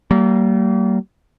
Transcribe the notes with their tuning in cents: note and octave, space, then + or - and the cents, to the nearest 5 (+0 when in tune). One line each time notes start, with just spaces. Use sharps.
G3 -40 A#3 -20